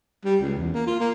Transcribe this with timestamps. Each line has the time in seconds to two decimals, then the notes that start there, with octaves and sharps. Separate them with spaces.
0.25 G3
0.42 C#2
0.58 E2
0.74 A#3
0.87 F4
1.00 A#3